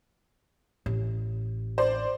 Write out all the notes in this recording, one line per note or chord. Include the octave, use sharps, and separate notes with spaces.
A1
C5 D5